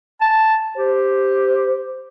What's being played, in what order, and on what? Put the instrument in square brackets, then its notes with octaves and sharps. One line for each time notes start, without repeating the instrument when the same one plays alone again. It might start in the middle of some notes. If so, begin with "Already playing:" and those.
[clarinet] A5
[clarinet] G4 [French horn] C5